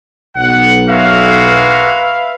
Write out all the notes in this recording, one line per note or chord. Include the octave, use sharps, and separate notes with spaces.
B1 F#5
G#3 A#3 F#4 B4 E5 F5